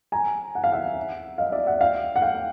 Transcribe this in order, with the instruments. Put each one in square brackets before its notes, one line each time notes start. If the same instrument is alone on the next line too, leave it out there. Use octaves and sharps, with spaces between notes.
[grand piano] G#5 A#5
F#5
F5
E5 F#5
D#5 F5
D5 E5
E5 F#5
F5 G5
F#5
F5 G5